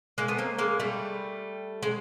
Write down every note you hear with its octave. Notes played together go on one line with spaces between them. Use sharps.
G#3 A#3
A3 B3
A#3 C4
G#3 A#3
G3 A3
G#3